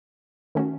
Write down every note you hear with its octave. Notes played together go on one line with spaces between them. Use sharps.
D#3 A3 C#4 F#4